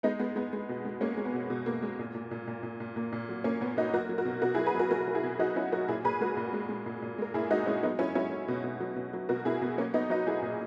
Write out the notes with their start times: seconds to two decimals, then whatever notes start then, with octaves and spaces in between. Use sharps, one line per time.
0.03 G#3 B3 D#4
0.19 G#3 B3
0.36 G#3 B3
0.53 G#3
0.69 B2
0.85 G#3
1.01 G#3 A#3 C#4
1.17 G#3
1.25 B3
1.34 B2
1.50 B2
1.66 B2 A#3
1.82 G#3
1.99 A#2
2.14 A#2
2.31 A#2
2.47 A#2
2.63 A#2
2.80 A#2
2.96 A#2 A#3
3.12 A#2
3.29 F#3
3.44 A#2 A#3 C#4
3.61 A#2 B3
3.77 A#2 D#4 F#4
3.93 F#3 F#4 A#4
4.09 F#3
4.18 F#4 A#4
4.25 B2
4.42 B2 F#4 A#4
4.54 E4 G#4
4.58 F#3
4.66 G#4 B4
4.75 F#3 F#4 A#4
4.91 F#3 F#4 A#4
5.08 F#3
5.15 E4 G#4
5.23 B2
5.39 F#3 D#4 F#4
5.56 F#3 C#4 E4
5.72 F#3 F#4 A#4
5.88 A#2 E4 G#4
6.05 A#2 G#4 B4
6.21 G#3 F#4 A#4
6.37 A#2
6.53 G#3
6.69 G#3
6.86 A#2
7.02 A#2
7.18 G#3 A#4
7.34 A#2 E4 G#4
7.50 G#3 D#4 F#4
7.66 G#3 C#4 E4
7.83 F#3 B3 D#4
7.99 F#3 C#4 E4
8.15 F#3 C#4 E4
8.31 F#3
8.48 B2
8.64 B2
8.80 F#3
8.96 B2
9.13 F#3
9.29 B2 F#4 A#4
9.45 B2 E4 G#4
9.61 B2 B3
9.78 F#3 A#3 C#4
9.94 F#3 B3 D#4
10.10 F#3 D#4 F#4
10.27 F#3 E4 G#4
10.42 A#2